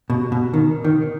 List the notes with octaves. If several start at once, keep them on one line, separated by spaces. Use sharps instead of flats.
B2
B2
D#3
D#3